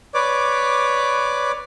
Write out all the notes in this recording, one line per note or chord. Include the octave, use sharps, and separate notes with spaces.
B4 C#5 D5 D6